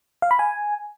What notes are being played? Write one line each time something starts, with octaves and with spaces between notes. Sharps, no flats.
F5
B5
G#5